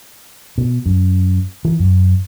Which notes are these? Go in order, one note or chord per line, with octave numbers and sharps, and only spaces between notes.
B2
F#2
E3
F#2